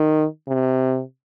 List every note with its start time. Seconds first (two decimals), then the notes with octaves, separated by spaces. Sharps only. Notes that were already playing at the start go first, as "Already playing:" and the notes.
Already playing: D#3
0.48 C3